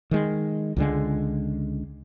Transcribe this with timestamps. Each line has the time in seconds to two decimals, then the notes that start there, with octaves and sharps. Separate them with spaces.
0.11 D#3 G#3
0.77 C#2 D3 G#3